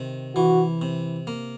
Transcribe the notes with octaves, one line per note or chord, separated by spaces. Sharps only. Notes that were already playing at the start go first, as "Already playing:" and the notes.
Already playing: C3 D#3
E3 F#4
C3
A#3